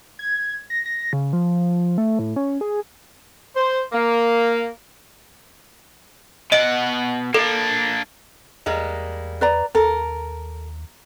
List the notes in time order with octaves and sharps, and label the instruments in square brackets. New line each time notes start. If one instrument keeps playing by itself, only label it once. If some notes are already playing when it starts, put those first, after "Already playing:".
[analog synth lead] G#6
A#6
A#6
C#3
F3
A3
A2
C#4
G#4
[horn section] C5
A#3
[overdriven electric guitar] B2 F#5 [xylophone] D#5 D7
[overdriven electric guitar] A#3 D4 [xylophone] A4
[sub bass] E2 [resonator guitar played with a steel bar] G3 G#3 A#3
[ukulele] B4 D5 A#5
[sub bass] D#2 [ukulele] A4 [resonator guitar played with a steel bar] A#4